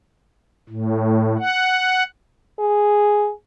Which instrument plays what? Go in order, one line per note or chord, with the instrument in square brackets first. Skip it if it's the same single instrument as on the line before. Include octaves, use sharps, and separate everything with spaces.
[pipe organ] A2
F#5
[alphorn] G#4